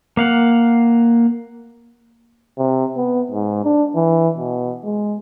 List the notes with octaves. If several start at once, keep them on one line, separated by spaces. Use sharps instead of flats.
A#3 F5 F#5
C3
B3
G#2
D4
E3
B2
G#3